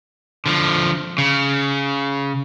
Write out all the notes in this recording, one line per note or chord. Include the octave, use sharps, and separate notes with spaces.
D3 F3
C#3